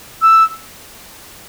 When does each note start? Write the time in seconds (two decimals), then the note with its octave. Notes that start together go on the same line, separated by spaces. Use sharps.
0.22 E6